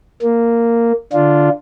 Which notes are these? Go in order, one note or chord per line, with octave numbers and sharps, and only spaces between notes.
A#3
D3 D4 F4